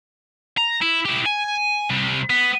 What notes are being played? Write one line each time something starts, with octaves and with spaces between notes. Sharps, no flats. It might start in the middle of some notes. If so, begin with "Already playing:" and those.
A#5
E4
E4 G4
G#5
C3 G3
B3